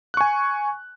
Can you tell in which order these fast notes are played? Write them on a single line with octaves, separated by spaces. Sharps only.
F#6 C#6 G#5